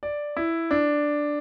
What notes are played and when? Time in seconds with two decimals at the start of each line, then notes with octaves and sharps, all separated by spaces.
0.03 D5
0.37 E4
0.71 D4